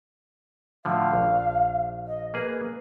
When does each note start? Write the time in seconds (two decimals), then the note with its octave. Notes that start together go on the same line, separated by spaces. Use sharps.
0.85 A2 D3 F3 F5
1.13 A#1
2.07 D#5
2.34 A#3 G#4 B4